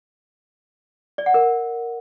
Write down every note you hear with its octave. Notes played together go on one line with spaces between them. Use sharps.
D5
F#5
A#4